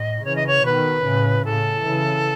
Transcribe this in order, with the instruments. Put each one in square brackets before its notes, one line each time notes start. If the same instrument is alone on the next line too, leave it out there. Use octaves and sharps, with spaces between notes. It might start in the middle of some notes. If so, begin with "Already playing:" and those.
Already playing: [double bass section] A2 [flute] D#5
[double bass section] C#3 E3 [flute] C#5
[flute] D#5
C#5
[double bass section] B2 D#3 [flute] B4
[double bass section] A2 C#3
[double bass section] A2 C#3 [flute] A4
[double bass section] C#3 E3